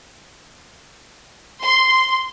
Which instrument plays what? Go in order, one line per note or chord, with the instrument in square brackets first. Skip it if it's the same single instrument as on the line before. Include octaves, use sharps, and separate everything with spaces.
[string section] C6